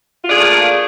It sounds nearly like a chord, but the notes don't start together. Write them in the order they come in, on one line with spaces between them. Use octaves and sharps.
F4 D4 G#4 A3 A#3